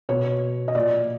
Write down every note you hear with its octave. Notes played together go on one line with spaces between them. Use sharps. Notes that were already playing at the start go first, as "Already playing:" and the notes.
B2 C#5
D#5
A#2 D5